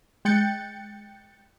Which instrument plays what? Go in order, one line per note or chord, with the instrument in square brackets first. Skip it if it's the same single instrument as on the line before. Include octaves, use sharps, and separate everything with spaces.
[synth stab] G#3 G5 F#6 G6 A6 C#7